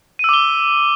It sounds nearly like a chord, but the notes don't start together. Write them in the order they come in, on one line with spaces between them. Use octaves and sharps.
D#7 E6 D6 G7